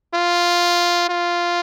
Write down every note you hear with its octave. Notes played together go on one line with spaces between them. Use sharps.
F4
F4